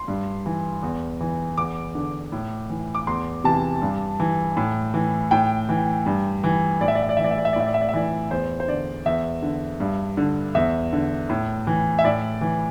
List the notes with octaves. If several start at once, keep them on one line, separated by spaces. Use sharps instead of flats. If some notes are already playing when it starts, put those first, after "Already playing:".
Already playing: C6
G2
E3
E2
E3
E2 D6
D3
A2
E3
D6
E2 C6
C3 E3 A5
G2
E3
A2
E3
A2 G5
E3
G2
E3
A2 D5
E5
D5
E5
D5
E3 E5
D5
E5
D5
E5
D5
A2 E5
D5
E5
D5
E5
E3 D5
E2 C5
C5
D3 D5
E2 E5
D3
G2
D3
E2 E5
D3
A2
E3
E5
A2 D5
E3